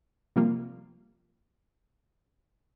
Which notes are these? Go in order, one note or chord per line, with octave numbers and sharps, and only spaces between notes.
C3 F3 G3 A#3 F4